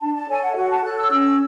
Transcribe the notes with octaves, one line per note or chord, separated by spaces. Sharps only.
D4 A5
A5
A4 C#5 G#5
F#5
E5
F#4 F#5
A5
A4 C#5 F#6
E6
C#4 E6